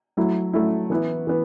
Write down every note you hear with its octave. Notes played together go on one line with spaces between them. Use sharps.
F#3 A3 E4
F#3 A3 E4
E3 B3 E4
E3 B3